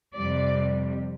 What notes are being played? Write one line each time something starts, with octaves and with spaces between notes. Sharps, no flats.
F2 C3 G3 D5